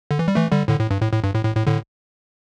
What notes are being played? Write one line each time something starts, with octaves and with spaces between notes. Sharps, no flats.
D3
E3
G3
E3 A3
D3 G3
A2 D3
A2
G2
A2
A2
G2
A2
A2
A2
A2 D3